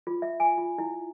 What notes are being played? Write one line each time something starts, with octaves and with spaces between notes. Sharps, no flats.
F4
E5
G#5
F4
E4